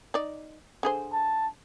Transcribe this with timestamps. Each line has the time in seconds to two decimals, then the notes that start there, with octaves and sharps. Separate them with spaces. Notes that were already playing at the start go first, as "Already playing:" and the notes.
0.14 D#4 D5
0.83 D3 G#4 C5
1.13 A5